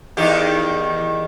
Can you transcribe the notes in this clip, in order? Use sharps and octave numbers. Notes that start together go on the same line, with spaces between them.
E2 D#3 G4